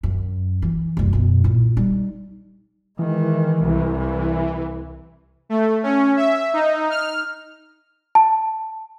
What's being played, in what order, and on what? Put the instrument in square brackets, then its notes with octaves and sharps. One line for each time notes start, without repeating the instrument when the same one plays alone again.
[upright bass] F#2
E3
F#1 C2
F#2 B2
A#2 E4
G3 D#4
[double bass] D#3 G#3 [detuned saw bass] E3
[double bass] C2
[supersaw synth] A3
C#4
E5
D#4
F6
[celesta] A5